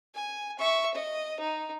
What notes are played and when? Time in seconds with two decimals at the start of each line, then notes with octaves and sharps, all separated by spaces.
0.14 G#5
0.59 E5 C#6
0.94 D#5
1.40 D#4